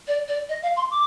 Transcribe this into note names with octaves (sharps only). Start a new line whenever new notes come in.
D5
D5
D#5
F5
C6
D6